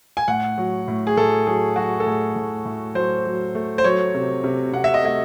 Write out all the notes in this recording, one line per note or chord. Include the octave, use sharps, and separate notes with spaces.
G#5
A2 F#5
F#3
A2
G#4
A2 A4
F#3 G#4
F#3 F#4
A4
A2 G#4
A2
A2
F#3 C5
F#3
A3
C5
F#3 C#5
C3
C3
C3 F#5
E5
D#5
A3 E5